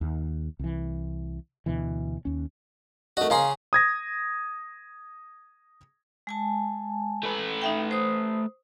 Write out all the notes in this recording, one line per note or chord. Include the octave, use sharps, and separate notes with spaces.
D#2
C2 E3
D2 B2 E3
D#2 C#4
A3 F#4 A#4 D#5
C#3 C#4 G#4 F5 A#5 C6
D#6 G#6 A#6
G#3 G#5 A5
A3 B4
D#4 E5 G5
C5 D#6